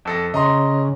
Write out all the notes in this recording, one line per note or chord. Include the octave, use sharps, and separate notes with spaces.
F2 A4 A#6
C#3 D#5 A#5 C6